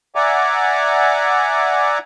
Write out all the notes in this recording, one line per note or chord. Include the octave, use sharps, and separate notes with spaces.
D5 E5 F#5 G#5 A#5 D6